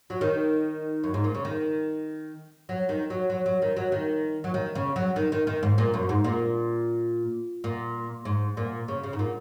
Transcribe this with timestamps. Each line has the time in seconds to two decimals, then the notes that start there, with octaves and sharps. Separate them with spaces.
0.10 F#3
0.21 D#3
1.04 F#2
1.14 G#2
1.24 A#2
1.34 C#3
1.45 D#3
2.69 F#3
2.89 D#3
3.10 F#3
3.30 F#3
3.46 F#3
3.62 D#3
3.77 F#3
3.92 D#3
4.44 F#3
4.54 D#3
4.75 C#3
4.96 F#3
5.16 D#3
5.32 D#3
5.47 D#3
5.63 G#2
5.78 A#2
5.94 F#2
6.09 G#2
6.24 A#2
7.64 A#2
8.25 G#2
8.57 A#2
8.88 C#3
9.04 C#3
9.13 G#2
9.19 A#2